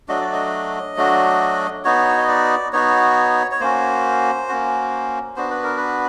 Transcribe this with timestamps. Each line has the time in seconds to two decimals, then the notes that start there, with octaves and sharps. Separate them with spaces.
0.08 F#3 A3 D4 F#4 D#5
0.21 D5
0.33 D#5
0.96 F#3 A3 D4 F#4
1.85 B3 D#4 F#4 C#5
2.18 D#5
2.29 D5
2.73 B3 D#4 F#4 C#5
3.51 C#5
3.60 A#3 C#4 F#4 C5
4.49 A#3 C#4 F#4
5.36 B3 D4 F#4 C5
5.51 B4
5.64 A#4
5.77 B4